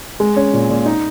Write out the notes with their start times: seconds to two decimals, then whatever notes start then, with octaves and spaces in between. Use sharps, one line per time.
0.20 G#3
0.36 C#4
0.53 A#2
0.70 A#2
0.86 D#4